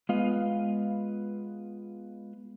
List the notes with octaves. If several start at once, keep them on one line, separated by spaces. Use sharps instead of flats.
G#3 B3 F4 B4 D#5 F5